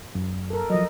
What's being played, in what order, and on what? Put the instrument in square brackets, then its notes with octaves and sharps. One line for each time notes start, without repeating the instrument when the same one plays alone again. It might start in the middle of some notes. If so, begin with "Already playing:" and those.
[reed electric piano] F#2
[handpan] A4 A#4
[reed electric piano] F3 F#3 [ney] D#5